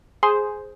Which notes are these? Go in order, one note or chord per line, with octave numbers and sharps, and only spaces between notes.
G#4 C5